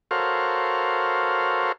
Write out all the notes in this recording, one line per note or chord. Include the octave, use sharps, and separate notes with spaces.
F#4 A4 A#4 C5 C#5 F5